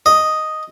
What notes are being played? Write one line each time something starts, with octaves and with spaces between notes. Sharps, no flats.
D#5